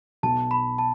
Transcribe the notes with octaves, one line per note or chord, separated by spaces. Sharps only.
B1 B2 B3 A5
B5
A5